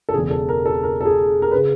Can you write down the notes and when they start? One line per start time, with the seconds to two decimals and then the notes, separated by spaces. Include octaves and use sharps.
0.09 A4
0.14 E1 E2 C#3 G#4
0.31 A4
0.49 A#4
0.66 A4
0.83 A#4
1.01 A4
1.05 G#4
1.42 A#4
1.51 B4
1.55 C#3